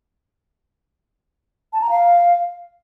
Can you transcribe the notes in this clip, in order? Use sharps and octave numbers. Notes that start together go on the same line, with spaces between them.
A5
A#5
F5